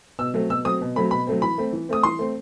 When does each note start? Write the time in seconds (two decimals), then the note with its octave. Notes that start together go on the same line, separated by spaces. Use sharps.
0.19 B2 E6
0.34 F#3 A3 C4
0.49 B2 E6
0.65 F#3 A3 C4 D#6
0.81 B2
0.96 F#3 A3 C4 B5
1.11 B2 B5
1.27 F#3 A3 C4
1.42 E3 B5
1.58 A3 C4
1.73 E3
1.89 A3 C4 D#6
2.03 E3 C6
2.19 A3 C4